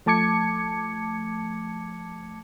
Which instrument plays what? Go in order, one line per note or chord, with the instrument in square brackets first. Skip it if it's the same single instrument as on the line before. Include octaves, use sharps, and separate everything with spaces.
[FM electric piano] F3 A3 A5 D6 G#6 C#7